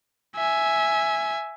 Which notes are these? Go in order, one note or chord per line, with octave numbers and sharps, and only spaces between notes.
E5 G#5